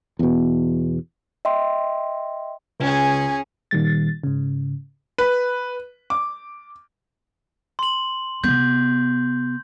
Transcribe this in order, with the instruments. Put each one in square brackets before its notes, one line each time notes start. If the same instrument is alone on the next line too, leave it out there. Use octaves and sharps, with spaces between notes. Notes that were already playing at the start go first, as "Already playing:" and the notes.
[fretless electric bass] E2 B2
[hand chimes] D#5 E5 G5 C6
[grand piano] C#2 [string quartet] C#4 G#4
[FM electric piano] A#2 D#3 G3 A6
G#2 C#3
[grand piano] B4
D6
[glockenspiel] C6 F#7
[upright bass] C3 B3 [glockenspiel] G6